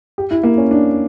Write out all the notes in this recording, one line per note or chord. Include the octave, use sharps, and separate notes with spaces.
G4
E4
A#3
C#4
D4